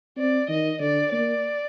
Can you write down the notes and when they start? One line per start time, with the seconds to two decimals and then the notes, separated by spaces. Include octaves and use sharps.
0.17 C4 D5
0.49 D#3 D#5
0.80 D3 D5
1.12 A#3 D5